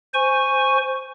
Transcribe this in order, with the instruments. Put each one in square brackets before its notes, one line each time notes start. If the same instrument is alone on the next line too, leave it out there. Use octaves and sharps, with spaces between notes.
[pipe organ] C5 G#5 C#6